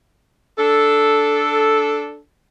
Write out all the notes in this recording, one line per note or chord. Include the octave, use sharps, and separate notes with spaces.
D4 A4